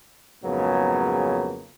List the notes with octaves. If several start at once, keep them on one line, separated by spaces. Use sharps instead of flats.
F2 G#2 C#3 F#3 A#3 B3